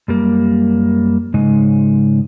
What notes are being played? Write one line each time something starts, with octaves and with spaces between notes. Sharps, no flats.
F#2 G3 A#3
G#2 C#3 G#3 D#4